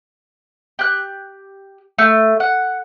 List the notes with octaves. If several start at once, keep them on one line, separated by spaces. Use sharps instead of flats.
G4 F#6
A3
F#5